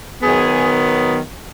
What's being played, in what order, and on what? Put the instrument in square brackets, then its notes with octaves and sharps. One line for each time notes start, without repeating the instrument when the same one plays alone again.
[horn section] D#3 F#3 B3 G#4